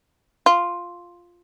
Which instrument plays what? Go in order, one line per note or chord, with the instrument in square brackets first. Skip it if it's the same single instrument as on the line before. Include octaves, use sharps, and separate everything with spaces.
[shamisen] F4